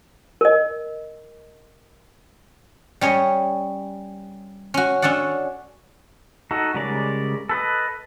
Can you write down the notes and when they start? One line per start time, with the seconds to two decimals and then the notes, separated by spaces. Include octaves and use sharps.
0.41 A#4 D#5
3.01 G3 C#4 C#5 D#5
4.74 C#4 F#4
5.02 C#4 D4 A4 D5 F#5
6.51 D#4 F#4 A4
6.74 C#3 G3 G#3 A#4 D5
7.49 A4 B4 D#5